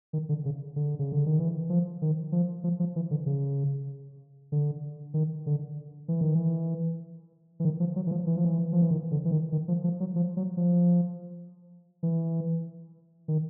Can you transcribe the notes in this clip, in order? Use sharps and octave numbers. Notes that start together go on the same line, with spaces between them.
D#3
D3
C#3
D3
C#3
D3
D#3
E3
F3
D#3
F3
F3
F3
E3
D3
C#3
D3
D#3
D3
E3
D#3
E3
E3
D#3
F3
F#3
E3
F3
E3
F3
E3
F3
E3
D#3
D3
E3
D#3
D#3
F3
F3
F#3
F3
F#3
F3
E3
D#3